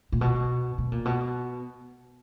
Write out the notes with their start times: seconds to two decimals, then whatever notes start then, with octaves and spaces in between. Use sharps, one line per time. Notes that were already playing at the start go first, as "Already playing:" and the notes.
0.12 A#2
0.21 B2
0.78 B2
0.92 A#2
1.05 B2